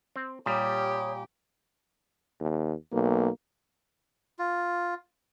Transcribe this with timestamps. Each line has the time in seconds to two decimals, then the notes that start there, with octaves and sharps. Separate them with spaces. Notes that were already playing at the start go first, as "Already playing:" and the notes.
0.16 C4
0.46 A#2 G3 G4 C#5 D#6
2.41 D#2
2.93 B1 A#3
4.39 F4